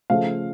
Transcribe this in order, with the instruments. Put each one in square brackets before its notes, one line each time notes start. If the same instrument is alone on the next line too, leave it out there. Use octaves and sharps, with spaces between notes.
[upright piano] C#3 F3 A3 F5